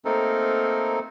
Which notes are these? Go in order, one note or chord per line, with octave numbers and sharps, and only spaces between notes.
A3 A#3 C4 D#4 A4 A#4